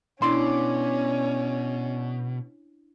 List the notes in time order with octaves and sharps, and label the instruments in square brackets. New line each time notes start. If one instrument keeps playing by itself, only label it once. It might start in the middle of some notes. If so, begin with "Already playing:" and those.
[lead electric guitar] B2 [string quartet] C#4 [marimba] D4 E4 [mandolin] D5 C6